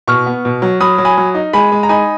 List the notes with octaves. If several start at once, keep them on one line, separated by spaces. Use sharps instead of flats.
B2 C#6 F6
B3
B2
F#3
F#3 B5 D#6
F#3
G#5 B5
F#3
D#4
G#3 G#5 B5
G#3
A#5
D#4 G#5 B5